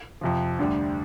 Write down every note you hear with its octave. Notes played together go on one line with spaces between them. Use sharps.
F2 C3 F3
D2 D3 G3